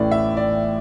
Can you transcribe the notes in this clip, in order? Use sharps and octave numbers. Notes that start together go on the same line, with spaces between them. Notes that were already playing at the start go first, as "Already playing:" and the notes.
Already playing: A1 A2 E3 D5
E5
D5